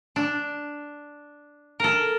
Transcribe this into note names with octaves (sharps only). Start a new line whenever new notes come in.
D4
A4 A#4